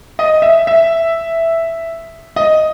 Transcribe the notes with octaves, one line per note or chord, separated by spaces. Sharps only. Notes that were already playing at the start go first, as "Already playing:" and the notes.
D#5
E5
E5
D#5